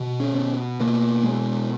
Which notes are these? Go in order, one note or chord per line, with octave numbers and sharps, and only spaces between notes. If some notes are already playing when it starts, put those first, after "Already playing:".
Already playing: B2
C#4
B2
B2 A#3
B2 G#3